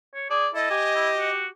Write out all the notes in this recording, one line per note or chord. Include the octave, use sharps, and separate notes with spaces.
C#5
G#4 D5
E4 A4 D#5
G4 G#5
E4
F#4